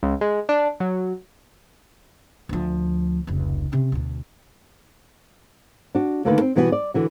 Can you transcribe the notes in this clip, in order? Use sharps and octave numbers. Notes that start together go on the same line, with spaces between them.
C#2
G#3
D4
F#3
D2 F3
F1 C#2
C3 C#4
D2 B2
D4 F#4
D2 D3 D#3 A#3 A4 B4
C4
B2 E3 G3 B3 F#4
D5
D3 E3 F#4